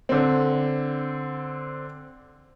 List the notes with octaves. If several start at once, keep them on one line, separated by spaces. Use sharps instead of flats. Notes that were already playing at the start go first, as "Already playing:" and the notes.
D3 C4